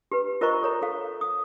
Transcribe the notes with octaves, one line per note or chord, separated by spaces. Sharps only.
G4 B4
F4 A#4 C5 D#5 A#5 C#6
A4 C#5 A#5
A4 F5
D#6